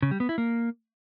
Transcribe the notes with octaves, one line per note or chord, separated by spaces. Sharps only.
C#3
G3
B3
E4
A#3